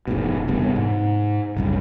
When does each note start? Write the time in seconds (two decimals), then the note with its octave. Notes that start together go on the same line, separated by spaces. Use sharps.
0.08 F1 G#2 B2
0.48 E1 G2 C3 B3
0.76 G#2
1.57 F#1 C2 F#2